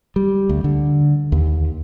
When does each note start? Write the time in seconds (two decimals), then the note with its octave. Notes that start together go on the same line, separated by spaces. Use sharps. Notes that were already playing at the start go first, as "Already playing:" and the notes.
0.16 G3
0.49 D2
0.64 D3
1.32 D#2